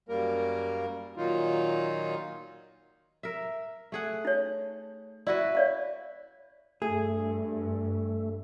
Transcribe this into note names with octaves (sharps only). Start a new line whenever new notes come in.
F#2 G3 A#3 A#4
A#2 D#3 F#3 D#4 F4
A#4 E5
A3 G#4 F#5
D#4 C#5
E4 F#4 B4 D5
C#5 D5 F5
G2 A3 G#4